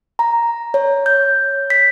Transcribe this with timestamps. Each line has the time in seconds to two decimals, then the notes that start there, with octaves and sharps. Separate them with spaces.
0.19 A#5
0.74 C#5
1.06 G6
1.70 B6